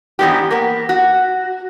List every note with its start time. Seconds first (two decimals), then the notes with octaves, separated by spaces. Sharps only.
0.19 G#2 E3 G#3 B3 D4 G4
0.51 A#3 B3
0.89 F#4